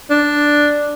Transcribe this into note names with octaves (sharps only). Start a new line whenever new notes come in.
D4